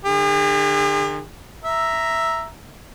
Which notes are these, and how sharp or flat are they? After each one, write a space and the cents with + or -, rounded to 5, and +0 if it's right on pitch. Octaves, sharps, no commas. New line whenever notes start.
D3 +40 G#4 -45
E5 +0 A#5 +0